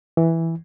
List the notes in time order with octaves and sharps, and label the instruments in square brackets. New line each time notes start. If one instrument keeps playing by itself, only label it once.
[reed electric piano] E3